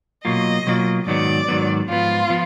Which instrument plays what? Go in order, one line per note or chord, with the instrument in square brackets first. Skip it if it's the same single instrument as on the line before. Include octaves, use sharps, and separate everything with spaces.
[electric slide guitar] B2 F#3 A#3 F4 [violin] D#5
[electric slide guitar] B2 F#3 A#3 F4
[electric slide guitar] G#2 D#3 F#3 B3 [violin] D5
[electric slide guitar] G#2 D#3 F#3 B3
[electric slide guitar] G#2 F3 B3 [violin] F4
[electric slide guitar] F3 B3